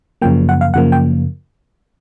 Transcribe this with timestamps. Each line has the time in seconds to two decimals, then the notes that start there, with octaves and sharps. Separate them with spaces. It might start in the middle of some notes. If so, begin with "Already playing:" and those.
0.22 F#2 C#3 F3 A#3 G5
0.49 F#5
0.61 F5
0.74 F#2 C#3 F3 A#3 F#5
0.92 G5